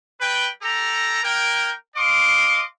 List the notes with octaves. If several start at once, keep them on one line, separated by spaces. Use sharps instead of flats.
G3 B4 G5
G4 A4 A#5
A#3 A#4 G5
D#5 F5 C6 D6